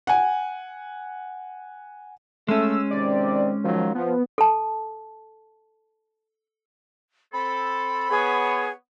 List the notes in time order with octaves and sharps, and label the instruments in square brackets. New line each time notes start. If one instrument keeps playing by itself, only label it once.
[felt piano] F#5 G#5
[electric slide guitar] G#3 C#4 [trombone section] A3 [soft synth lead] E6
[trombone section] C3 D#3 C4 [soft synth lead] D5
[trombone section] D#3 F#3 F4 [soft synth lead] F3
[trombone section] F3 [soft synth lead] B3
[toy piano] A4 A5
[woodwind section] C4 A4 [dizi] B5
[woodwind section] B3 C#5 [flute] G#4